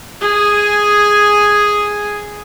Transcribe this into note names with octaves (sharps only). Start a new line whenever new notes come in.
G#4 G#5